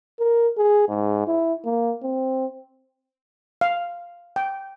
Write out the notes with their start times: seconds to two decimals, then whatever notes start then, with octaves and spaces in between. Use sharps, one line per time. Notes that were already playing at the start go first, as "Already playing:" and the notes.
0.19 A#4
0.57 G#4
0.89 G#2
1.27 E4
1.65 A#3
2.02 C4
3.61 F5
4.36 G5